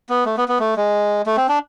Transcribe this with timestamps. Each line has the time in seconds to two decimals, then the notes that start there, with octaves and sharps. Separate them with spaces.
0.09 B3
0.26 A3
0.37 B3
0.48 B3
0.59 A3
0.77 G#3
1.26 A3
1.37 C4
1.49 D4